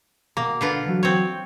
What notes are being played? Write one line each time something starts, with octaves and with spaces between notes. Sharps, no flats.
B2 A#3 A#5
D3 F4 B4
E3 F#3 F#4
C4 C#5